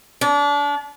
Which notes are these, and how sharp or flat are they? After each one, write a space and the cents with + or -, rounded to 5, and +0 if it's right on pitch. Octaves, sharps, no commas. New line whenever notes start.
D4 -30